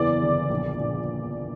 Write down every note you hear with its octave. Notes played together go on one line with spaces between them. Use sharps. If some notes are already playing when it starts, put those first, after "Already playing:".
Already playing: F#1 E2 E3 D5 D6
G1
A#1
A#2